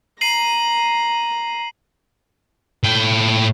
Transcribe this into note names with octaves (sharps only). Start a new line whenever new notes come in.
A#5 C7 D#7 F#7
A2 G5